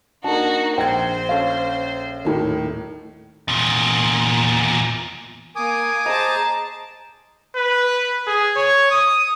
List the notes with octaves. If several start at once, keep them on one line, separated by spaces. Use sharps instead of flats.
A#3 D4 D#4 F#4 A5
A#1 C5 G5 G#6
C#4 A4 F5
D#1 A2 D#3
E2 A#2
A#3 G#5 D6 D#6
G#4 C5 D#5 A5 A#5
B4
G#4
C#5
D#6